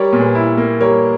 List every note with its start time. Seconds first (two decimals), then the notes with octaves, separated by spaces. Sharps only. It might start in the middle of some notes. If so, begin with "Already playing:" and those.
Already playing: G3 A#4 C#5
0.13 A#2
0.20 G#4 B4
0.35 E4
0.57 A#3
0.81 G3 A#4 C#5